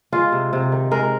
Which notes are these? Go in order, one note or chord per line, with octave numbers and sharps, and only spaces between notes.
G#3 F4
C3
C3
D#3
G#3 A#4